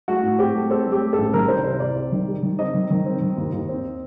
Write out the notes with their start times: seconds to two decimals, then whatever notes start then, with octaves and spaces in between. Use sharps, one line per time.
0.08 A3 F#4
0.23 A2
0.39 C4 G4
0.55 A3
0.70 C4 A4
0.86 A3
0.92 G4
1.01 C4
1.13 A4
1.18 A1
1.33 D#3 A#4
1.48 C2 C5
1.64 C3 C5
1.80 C2 D5
1.96 C2
2.12 D#3
2.28 G3
2.43 D#3
2.59 C4 D#5
2.74 D#3
2.91 D#3
3.06 C4
3.22 D#3
3.37 D#2
3.53 D#2
3.69 C4